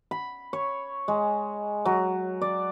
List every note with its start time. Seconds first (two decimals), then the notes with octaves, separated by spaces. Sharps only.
0.11 B5
0.53 C#5
1.08 G#3
1.85 F#3
2.42 D5